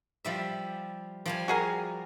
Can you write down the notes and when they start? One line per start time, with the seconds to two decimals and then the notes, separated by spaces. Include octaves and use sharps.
0.25 F3 G3 E5
1.26 F3 G3 G#5
1.48 F#4 G#4 A#4